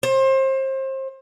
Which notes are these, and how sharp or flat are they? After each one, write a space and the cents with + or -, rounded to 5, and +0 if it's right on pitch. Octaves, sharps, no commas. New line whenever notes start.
C5 +30